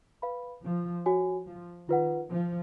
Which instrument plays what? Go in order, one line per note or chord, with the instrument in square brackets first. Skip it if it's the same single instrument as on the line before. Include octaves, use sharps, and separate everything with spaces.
[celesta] B4 F5 B5
[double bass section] F3
[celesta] F#4 C#5 G#5
[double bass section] F3
[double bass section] D#3 [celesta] F4 B4 F#5
[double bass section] F3